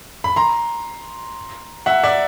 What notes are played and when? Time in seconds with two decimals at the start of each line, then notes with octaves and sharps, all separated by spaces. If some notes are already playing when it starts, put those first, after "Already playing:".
0.24 B5
0.36 A#5 C6
1.86 E5 F#5
2.04 D5 E5